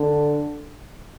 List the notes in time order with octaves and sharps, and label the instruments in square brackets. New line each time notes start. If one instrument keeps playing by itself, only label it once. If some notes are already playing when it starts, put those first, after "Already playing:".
Already playing: [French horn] D3